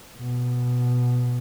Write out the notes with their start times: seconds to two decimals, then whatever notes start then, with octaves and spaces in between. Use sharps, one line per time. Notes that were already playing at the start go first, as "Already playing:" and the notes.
0.17 B2